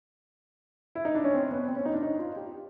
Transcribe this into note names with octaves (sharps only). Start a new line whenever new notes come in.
E4
D#4
D4
C#4
C4
B3
C4
C#4
D#4
D4
D#4
F4
G4